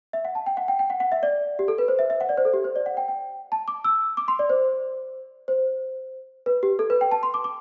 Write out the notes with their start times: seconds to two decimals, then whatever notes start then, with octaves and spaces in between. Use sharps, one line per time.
0.13 E5
0.25 F#5
0.35 A5
0.46 G5
0.57 F#5
0.68 G5
0.79 G5
0.90 F#5
1.00 F#5
1.12 E5
1.23 D5
1.59 G4
1.68 A4
1.78 B4
1.88 C5
1.99 E5
2.10 E5
2.21 F#5
2.29 D5
2.37 C5
2.45 A4
2.53 G4
2.64 C5
2.76 D5
2.86 F#5
2.97 G5
3.08 G5
3.52 A5
3.68 D6
3.84 E6
4.17 D6
4.28 C6
4.39 D5
4.50 C5
5.48 C5
6.46 B4
6.63 G4
6.79 A4
6.90 B4
7.01 G5
7.11 A5
7.23 C6
7.34 D6
7.44 D6